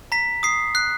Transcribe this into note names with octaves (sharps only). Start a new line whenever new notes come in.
A#5 B6
D#6 C7
F#6 C7